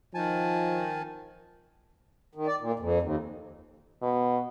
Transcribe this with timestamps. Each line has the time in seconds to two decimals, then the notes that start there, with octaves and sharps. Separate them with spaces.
0.14 D#3 F3 G#5 A5
2.35 D#3
2.47 D5
2.60 A#2
2.79 F2
3.02 D#2
4.02 B2